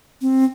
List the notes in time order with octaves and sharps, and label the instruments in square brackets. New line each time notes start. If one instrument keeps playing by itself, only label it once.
[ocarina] C4